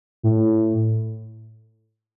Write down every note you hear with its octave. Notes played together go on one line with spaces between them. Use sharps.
A2